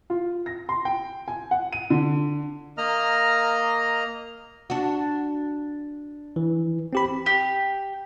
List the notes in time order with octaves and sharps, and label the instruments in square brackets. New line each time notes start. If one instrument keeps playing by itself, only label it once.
[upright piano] F4
A#6
C6
G5
G#5
F#5
D#7
D3
[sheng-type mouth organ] A#3 D#5 A#5 F6
[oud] D4 F#4
[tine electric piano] E3
C4 G4 B5
[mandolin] G4